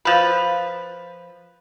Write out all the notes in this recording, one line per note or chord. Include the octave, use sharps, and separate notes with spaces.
F3 B4